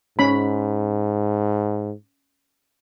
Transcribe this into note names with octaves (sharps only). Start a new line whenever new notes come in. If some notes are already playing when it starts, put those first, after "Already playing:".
G#2 C#4 B5